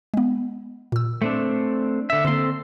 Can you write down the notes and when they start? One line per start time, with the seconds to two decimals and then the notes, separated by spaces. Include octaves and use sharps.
0.14 G#3 B3
0.92 A#2 E6
1.22 A3 C4 D4
2.10 D3 E5
2.25 D3 A#3 C4 A4 C6